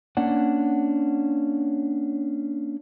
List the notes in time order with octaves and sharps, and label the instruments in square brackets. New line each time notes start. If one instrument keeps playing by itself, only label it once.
[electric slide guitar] A#3 C#4 D4 F#5